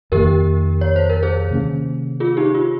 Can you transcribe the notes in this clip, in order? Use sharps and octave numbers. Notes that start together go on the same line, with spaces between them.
F2 D#3 A#3 G4 A#4
C#5
C5
A#4
G#4 C5
C3 D#3 A#3 C#4
F4 G#4
D#4 G4
F4